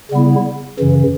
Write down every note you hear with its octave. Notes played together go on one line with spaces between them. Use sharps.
C#3 G3 B3 E4
F#2 C#3 E3